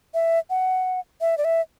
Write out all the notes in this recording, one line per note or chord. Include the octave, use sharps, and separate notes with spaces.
E5
F#5
E5
D5
E5